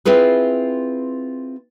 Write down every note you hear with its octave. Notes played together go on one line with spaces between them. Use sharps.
C4 E4 F4 G#4 B4